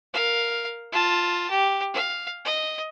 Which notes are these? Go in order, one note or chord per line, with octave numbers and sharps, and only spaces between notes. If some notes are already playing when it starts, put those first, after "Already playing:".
A#4 F5
F4 A5
G4
F5
D#5